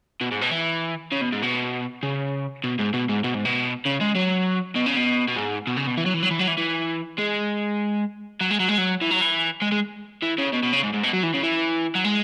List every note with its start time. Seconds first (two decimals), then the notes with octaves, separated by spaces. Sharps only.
0.21 B2
0.31 G#2
0.41 B2
0.51 E3
1.12 C#3
1.21 B2
1.33 G#2
1.43 B2
2.03 C#3
2.64 B2
2.79 G#2
2.94 B2
3.09 G#2
3.24 B2
3.34 G#2
3.45 B2
3.85 C#3
4.00 G#3
4.15 F#3
4.75 B2
4.86 C#3
4.96 B2
5.28 B2
5.36 G#2
5.67 B2
5.77 C#3
5.87 B2
5.97 E3
6.06 F#3
6.14 E3
6.23 F#3
6.31 E3
6.39 F#3
6.48 E3
6.58 E3
7.19 G#3
8.41 F#3
8.51 G#3
8.60 F#3
8.69 G#3
8.78 F#3
9.02 E3
9.11 F#3
9.22 E3
9.62 G#3
9.72 G#3
10.22 E3
10.38 C#3
10.53 B2
10.63 B2
10.73 C#3
10.83 G#2
10.93 G#2
11.03 B2
11.13 F#3
11.23 E3
11.34 C#3
11.43 E3
11.95 F#3
12.04 G#3